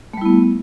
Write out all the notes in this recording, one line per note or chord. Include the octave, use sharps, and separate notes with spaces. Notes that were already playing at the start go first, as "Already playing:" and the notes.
G3 A3 B3 E4